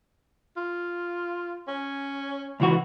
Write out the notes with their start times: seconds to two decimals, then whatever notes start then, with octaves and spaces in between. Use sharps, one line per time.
0.57 F4
1.68 C#4
2.60 C#2 E3 F#4